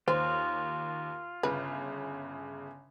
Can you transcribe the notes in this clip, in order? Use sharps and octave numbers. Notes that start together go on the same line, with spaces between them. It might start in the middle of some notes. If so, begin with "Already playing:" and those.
D#2 F4 C5
G1 C#3 B4